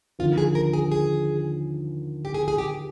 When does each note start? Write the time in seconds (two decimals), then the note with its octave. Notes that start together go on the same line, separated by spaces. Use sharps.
0.19 D#2 D3 F3 F4
0.38 G#4
0.55 A#4
0.73 G#4
0.92 G#4
2.25 G4
2.34 G#4
2.48 G#4
2.58 G4